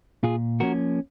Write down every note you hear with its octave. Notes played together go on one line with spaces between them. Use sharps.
A#2 F4 G#4
F3 A#3 C#4 F#4 A#4